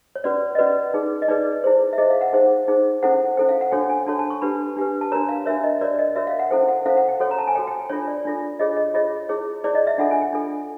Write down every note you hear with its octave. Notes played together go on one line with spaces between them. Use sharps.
C#5
C#4 F#4 B4 D5
D#5
C#4 F#4 B4 D5
D#4 G#4 B4
D#5
D#4 G#4 B4 D5
E4 G#4 C5
E5
E4 G#4 C5 D#5
F5
F#5
D#4 G#4 C5
D#4 G#4 C5
C#4 E4 A4 C5 F#5
C#4 E4 A4 C5 G5
F5
F#5
D4 F#4 A4 C#5 G5
G#5
D4 F#4 A4 C#5 A5
A5
C#6
D4 G4 B4 B5
D4 G4 B4
A5
D4 F#4 A#4 C#5 A#5
F5
D4 F#4 A#4 C#5 E5
D#5
F#4 A#4 C#5 D5
D#5
F#4 A#4 C#5 E5
F5
F#5
C#4 E4 A4 C5 G5
F#5
C#4 E4 A4 C5 F5
F#5
G5
F#4 A4 C#5
A#5
A5
G#5
F#4 A4 C#5 G5
G5
D4 F4 A4 C#5
D5
D4 F4 A4
F4 G#4 C#5 D#5
D#5
F4 G#4 C#5 D#5
E4 G#4 C#5
E4 G#4 C#5 D5
D#5
E5
D4 F4 A4 F#5
G#5
G5
D4 F4 A4